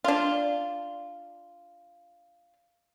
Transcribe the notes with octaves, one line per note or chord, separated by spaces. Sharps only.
D4 F4